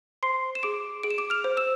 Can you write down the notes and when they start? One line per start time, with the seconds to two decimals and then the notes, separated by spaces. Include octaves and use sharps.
0.23 C5 C6 C7
0.55 E7
0.63 G#4 D6 D7
1.03 G#4 D7
1.10 E7
1.18 D6 D7
1.30 F6 F7
1.44 C5
1.57 E6 E7